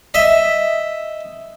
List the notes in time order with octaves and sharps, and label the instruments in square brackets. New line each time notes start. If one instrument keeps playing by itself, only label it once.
[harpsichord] D#5 E5